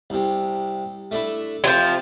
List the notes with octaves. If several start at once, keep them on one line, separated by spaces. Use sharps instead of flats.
C2 C3
A3 D4 E4
C3 F3 F#3